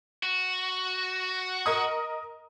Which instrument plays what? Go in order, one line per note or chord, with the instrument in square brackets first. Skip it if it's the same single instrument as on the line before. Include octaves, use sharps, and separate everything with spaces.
[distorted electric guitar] F#4
[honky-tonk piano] A#4 D#5 D#6